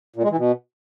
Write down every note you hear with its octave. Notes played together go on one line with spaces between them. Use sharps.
A#2
G#3
E3
B2